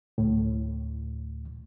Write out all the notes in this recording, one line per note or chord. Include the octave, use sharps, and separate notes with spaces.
D2 A2